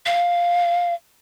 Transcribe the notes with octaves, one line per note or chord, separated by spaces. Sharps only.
F5